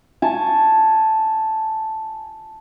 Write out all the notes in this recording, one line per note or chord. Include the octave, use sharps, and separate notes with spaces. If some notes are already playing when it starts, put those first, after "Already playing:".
G#5 A5 C#6